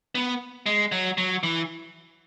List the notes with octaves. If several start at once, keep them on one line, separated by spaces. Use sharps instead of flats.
B3
G#3
F#3
F#3
E3